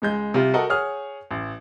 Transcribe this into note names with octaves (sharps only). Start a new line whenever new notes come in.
C#2 G#3 G6
C3 G3 F4
F#4 A4 A#4 D#5 F#5
G#4 C#5 F#5 D#6 F6
A1